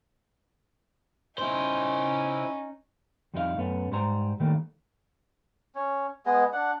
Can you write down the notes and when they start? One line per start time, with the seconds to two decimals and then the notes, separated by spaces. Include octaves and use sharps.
1.38 C#4 D#4 E4 C5
3.34 F2 G3 D#4 E4 A4 F5
3.57 F#2 A3 B3 C#4
3.91 G#2 G3 C5 A#5
4.40 D#3 E3 G3 A3 A#3
5.75 C#4
6.26 G#3 B3 G#4 D#5
6.53 D4 F#5